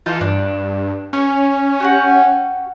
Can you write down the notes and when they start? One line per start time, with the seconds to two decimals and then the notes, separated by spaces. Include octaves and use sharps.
0.06 E3 D#4 F4 A4
0.21 G2 D4 D5
1.13 C#4 C#5 G#5
1.80 F#4 G4 F#5